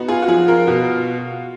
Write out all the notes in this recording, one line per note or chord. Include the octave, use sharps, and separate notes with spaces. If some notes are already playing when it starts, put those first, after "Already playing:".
Already playing: B3 D#4 F#4
F4 G#4
F#4
F3 G#4
F4 A#4
B2 F#4